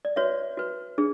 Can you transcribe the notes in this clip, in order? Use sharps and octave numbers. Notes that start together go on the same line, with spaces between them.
D5
F#4 B4 C#5 E5
F#4 B4
D4 G#4